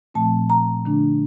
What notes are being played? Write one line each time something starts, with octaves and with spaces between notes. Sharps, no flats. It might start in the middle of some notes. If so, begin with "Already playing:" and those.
A#2 F3 A3 C4 A5
A#5
D3 A3 D4